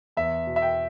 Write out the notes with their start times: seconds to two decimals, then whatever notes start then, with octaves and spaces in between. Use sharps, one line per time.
0.17 E2 E5
0.47 B2
0.56 E5
0.62 G5